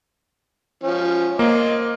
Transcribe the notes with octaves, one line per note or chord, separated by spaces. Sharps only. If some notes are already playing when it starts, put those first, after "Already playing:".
F3 C#4
A#3 C5 D#5 D6